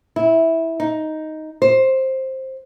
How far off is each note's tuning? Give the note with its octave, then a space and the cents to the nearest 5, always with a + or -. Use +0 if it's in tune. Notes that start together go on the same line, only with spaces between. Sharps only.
E4 -10
D#4 +5
C5 +10